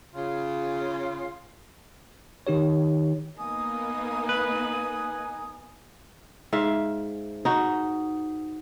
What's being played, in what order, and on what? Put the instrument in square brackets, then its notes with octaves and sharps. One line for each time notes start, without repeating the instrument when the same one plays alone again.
[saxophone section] C#3 F4
[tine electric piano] D#3 D#4 G4 C#5
[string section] A#3 B3 D#4 [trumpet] G#5 [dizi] D#6
[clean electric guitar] B4
[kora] G#2 E5 F5
D#4 F#4